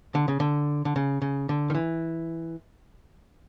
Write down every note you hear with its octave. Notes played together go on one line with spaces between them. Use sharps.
D3
C#3
D3
D3
C#3
C#3
D3
D#3
E3